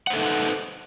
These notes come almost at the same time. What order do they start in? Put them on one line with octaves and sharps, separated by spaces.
F#5 C5 A4 D#4 B4